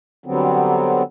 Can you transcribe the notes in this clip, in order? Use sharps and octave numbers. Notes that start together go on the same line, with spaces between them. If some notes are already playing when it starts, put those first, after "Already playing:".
D3 F#3 G3 B3 C4